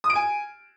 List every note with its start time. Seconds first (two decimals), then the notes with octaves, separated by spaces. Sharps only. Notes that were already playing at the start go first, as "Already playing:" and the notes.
0.04 D#6
0.10 D7
0.15 G#5